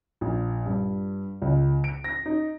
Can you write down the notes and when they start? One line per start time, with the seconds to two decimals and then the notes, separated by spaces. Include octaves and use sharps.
0.21 A#1
0.66 G2
1.42 C#2
1.84 D7
2.04 A#6
2.26 D#4